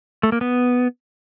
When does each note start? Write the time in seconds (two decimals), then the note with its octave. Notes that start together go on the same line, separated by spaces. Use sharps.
0.23 A3
0.32 A#3
0.41 B3